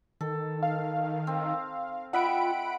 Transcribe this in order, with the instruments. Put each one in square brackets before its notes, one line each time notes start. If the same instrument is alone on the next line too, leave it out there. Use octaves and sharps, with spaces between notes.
[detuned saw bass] D#3 [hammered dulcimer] A4
[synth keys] F5
[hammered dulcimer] C4
[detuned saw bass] F4 [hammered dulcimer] D#5 E5 G5 [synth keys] F#5 B5 D7